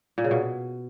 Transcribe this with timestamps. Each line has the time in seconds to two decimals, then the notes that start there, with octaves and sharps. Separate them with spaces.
0.18 A#2
0.24 C#3
0.31 B2